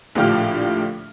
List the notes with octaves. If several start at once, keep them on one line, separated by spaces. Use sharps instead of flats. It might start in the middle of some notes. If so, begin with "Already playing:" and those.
A#1 A2 D3 F4 G4 F6